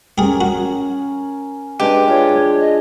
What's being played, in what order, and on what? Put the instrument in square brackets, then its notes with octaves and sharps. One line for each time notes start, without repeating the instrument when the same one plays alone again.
[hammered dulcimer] C#4 A#4 [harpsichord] G4 G#4
[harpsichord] F#4
[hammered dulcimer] G#3 D4 G#4 [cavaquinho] G4 [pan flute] B4
[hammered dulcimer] F4 [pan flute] C#5
[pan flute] D#5